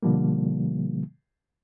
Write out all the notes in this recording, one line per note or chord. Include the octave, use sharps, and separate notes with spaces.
B2 D3 F3 G3 A#3